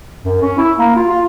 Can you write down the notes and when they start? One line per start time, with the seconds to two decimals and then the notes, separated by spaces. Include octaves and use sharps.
0.24 F#2
0.41 C#4
0.58 E4
0.79 A#3
0.96 F4
1.09 F4